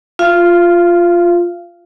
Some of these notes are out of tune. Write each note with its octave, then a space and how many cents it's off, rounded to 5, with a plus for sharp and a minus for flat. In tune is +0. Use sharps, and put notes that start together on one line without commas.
F4 +0 F5 -30